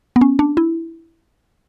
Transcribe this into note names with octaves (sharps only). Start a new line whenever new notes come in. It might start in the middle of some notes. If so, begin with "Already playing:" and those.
B3
C#4
D4
E4